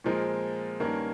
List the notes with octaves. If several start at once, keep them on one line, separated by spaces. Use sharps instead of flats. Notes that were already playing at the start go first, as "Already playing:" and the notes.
A#2 F3 G#3 C4 A#4
G2 D#3 A#3 C#4